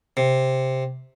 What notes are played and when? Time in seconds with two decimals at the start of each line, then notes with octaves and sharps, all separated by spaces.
0.17 C3